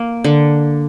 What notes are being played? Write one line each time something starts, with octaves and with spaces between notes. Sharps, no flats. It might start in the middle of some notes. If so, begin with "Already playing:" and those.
Already playing: A#3
D3